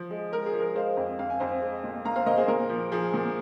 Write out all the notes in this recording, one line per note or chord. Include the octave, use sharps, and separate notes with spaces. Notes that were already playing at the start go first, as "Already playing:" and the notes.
Already playing: F3
G#3
G#3 A#4
G#4
F3
A#4
G#3 C5 F5
F2
F2 F5
G#5
F2 C5 F5
G#3
A#2
A#2 F5 A#5
C5 F5
A#2 A#4 D#5
G#4 C5
A#2 A#4
F3
F3 G#4
A#2